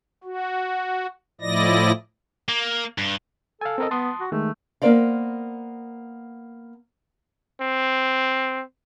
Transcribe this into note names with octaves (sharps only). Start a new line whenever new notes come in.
F#4
A2 F3 E4 D5 D#5 A#6
A#3
G2
A4 F5 G#5
C4 A#4 D#5
B3 A5 C6 D#6
F#4
D#3 G#3 A3
A#3 B3 A#4 C5 D5 F5
C4